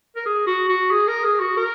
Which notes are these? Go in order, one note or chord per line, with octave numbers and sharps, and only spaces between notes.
A#4
G#4
F#4
F#4
G#4
A#4
G#4
F#4
A#4